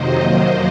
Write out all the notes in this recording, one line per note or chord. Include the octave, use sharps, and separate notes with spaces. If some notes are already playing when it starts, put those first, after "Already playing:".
Already playing: F2 C3 D#3 F#3 A#3 C5 D#5